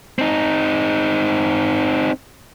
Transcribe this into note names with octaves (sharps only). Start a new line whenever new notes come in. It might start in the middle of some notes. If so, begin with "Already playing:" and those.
C4 D#4